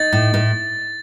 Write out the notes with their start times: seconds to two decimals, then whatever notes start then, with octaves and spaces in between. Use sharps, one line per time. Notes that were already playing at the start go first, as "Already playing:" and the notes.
Already playing: D#4 A6
0.13 A2
0.34 A2